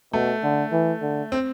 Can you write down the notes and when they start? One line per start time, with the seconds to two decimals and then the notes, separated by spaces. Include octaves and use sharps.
0.13 B2 A3
0.43 D3
0.72 E3
1.02 D3
1.32 C4